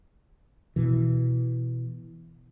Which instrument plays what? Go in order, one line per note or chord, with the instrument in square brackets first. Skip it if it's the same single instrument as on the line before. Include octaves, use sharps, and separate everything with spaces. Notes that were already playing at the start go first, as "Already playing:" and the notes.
[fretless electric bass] B2 E3